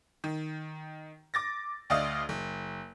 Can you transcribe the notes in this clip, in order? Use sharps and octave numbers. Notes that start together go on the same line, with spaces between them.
D#3
D6 A6 A#6
D2 A3 D5 D#5 F5 D#6
F#1